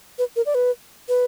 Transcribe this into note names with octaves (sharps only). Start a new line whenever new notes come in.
B4
A#4
D5
B4
B4